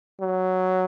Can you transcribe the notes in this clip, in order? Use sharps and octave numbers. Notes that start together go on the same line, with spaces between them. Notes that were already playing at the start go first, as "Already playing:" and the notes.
F#3